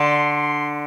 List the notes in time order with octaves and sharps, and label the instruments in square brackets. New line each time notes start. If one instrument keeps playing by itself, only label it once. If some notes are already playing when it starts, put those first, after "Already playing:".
Already playing: [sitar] D3 [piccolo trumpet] C6
[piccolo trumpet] C6